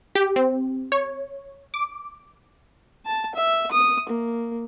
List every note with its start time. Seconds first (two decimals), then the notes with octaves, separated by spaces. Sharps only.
0.15 G4
0.36 C4
0.92 C#5
1.74 D6
3.06 A5
3.35 E5
3.71 D#6
4.09 A#3